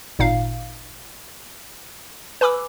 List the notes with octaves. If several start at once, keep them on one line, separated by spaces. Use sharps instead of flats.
G#1 A#2 D#4 F5
B4 G#5 B5 D6 E6